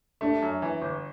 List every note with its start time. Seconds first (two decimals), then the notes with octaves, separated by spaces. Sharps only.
0.21 A3 D4
0.42 F#2
0.62 E3
0.82 G1